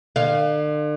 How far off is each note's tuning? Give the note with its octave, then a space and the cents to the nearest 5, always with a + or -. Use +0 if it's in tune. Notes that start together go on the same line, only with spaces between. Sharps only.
D3 +40 F5 +0